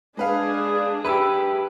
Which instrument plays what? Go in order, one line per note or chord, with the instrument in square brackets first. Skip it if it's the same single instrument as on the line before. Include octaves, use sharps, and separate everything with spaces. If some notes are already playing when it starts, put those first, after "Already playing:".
[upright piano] G#3 B4 F5 [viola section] D4 G#4
[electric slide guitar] G4 B4 [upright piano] E5 B5 E6